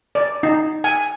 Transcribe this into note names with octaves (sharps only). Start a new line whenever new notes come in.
D5
D#4
G#5